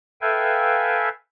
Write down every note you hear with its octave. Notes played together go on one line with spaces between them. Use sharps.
A4 B4 E5 F5 G5 G#5